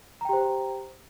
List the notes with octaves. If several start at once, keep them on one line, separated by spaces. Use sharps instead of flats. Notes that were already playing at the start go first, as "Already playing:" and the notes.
G4 C5 G5 A#5